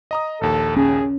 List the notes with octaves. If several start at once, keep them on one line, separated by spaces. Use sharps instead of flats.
D#5 A#5 D#6
A#1 D#2 A4
C#4 G#4